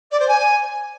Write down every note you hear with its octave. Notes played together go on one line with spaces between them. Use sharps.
D5
C5
G#5